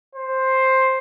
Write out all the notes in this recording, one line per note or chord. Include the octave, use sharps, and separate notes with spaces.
C5